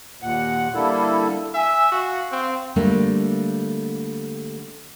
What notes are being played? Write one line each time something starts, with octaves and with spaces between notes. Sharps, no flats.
D#2 A#2 F#5
D3 G3 A#3 E4 A4
E5 G#5 E6
F#4 F5
C4
D3 G3 A3 A#3 D4